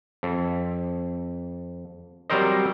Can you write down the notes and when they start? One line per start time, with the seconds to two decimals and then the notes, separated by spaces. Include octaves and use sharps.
0.23 F2
2.30 F#3 G3 C4 A#4 C5 D#5